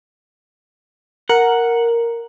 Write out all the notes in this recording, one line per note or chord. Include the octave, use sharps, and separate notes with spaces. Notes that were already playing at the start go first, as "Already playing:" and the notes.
A#4 F#5